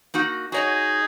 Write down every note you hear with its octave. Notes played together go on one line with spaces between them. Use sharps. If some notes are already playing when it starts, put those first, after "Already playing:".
A#3 D#4 F#4
D#4 F#4 G#4 C#5 D#5